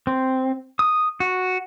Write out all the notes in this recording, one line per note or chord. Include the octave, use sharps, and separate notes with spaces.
C4
D#6
F#4